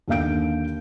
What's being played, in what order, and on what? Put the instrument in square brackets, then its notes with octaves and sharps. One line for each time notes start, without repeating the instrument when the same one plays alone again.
[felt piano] D#2 D3 A#3 F5 G6 D7